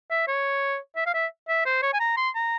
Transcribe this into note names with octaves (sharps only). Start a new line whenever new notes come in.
E5
C#5
E5
F5
E5
E5
C5
C#5
G#5
A#5
C6
A#5